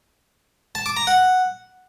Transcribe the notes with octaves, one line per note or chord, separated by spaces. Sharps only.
A5
D6
A#5
F#5